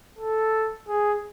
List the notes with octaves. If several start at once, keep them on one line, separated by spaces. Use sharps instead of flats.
A4
G#4